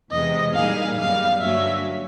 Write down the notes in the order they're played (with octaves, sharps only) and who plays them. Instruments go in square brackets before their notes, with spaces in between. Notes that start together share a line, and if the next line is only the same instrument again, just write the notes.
[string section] E2 C3 E3 G#3 [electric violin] D#5
[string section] A#2 G3 A#3 D#4 G#4 [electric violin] F5
[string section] F#2 D#3 G3 B3 [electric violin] F5
[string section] G2 D3 F#3 A#3 C#4 [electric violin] E5